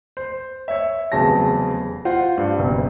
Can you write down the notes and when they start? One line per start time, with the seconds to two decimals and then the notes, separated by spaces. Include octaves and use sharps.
0.17 C5
0.68 C#5 E5
1.12 F1 E2 C#3 F#3 A5 A#6
2.05 F4 C5 F#5
2.37 G2
2.57 F#1 B2